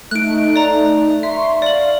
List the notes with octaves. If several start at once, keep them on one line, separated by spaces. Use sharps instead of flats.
A3 D#4 F#6 D7
D5 A#5
E5 C6 C#6
D5 F5 F#7